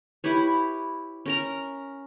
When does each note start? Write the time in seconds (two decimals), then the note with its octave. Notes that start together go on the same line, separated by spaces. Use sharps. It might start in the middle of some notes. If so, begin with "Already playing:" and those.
0.24 E4 G4 B4 C#5
1.26 C#4 A#4 A#5